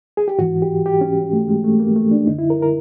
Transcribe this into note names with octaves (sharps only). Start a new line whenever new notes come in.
G#4
G4
G#2 E3 F#4
G4
G4
C#4
A3
G#3
A3
A#3
A3
D4
F#2 D3 D#4
E4
A#4
A#4